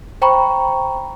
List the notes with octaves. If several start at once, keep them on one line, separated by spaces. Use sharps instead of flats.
C5 G5 A#5 B5 C#6